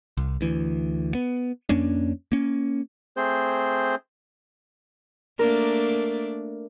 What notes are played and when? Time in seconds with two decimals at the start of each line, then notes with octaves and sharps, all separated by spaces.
0.17 C2
0.41 D2 E3
1.15 B3
1.69 F2 A#3 C#4 D4
2.32 A#3 C#4
3.17 A3 C4 G#4 C5 G6
5.39 A3 A#3 D4 A#4